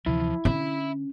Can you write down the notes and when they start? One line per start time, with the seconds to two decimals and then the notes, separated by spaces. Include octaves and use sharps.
0.06 D2 C3 E3 F3 E4
0.45 D3 C#4 E5 B5